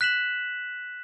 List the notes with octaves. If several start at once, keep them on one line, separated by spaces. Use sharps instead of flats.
F#6 B6 E7 F#7